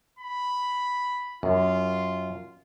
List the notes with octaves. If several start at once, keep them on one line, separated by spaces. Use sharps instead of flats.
B5
F#2 F4